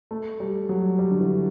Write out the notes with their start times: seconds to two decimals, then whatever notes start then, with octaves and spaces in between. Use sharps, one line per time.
0.11 A3
0.40 G3
0.69 F#3
0.99 G3
1.11 D3
1.20 E3